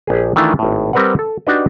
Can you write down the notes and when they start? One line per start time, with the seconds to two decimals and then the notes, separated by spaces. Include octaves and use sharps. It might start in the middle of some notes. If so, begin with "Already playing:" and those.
0.07 A#1 G4 G#4
0.36 D#3 E3 A3 D4 E4 F4
0.59 G#1 A2
0.93 G3 C4 A#4 B4 D5 F#5
1.19 A4
1.47 D4 D#4 F#4 G4 B4 D#5